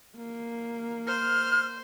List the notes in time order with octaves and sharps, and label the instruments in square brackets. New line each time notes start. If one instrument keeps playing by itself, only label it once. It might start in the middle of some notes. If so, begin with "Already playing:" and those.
[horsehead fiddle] A#3
[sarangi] C5 [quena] F6